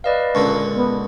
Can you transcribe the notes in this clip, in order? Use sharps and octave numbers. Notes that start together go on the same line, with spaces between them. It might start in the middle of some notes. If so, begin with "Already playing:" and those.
B4 D5 D#5 F5
C#2 A#2 D3 C#6
B3